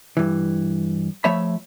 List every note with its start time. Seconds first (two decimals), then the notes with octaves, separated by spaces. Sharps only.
0.17 G2 E3
1.24 F3 A3 C#5 E5 B5